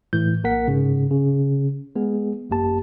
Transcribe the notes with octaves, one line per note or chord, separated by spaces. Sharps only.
A2 E3 G6
A#1 A#3 A#4 F#5 B6
G#2 C#3
C#3
G#3 B3 G#4
G#1 F#2 A#3 G4 A5